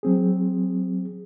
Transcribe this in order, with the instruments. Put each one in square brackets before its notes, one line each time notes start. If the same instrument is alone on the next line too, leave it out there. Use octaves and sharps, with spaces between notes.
[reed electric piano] F#3 C4 G#4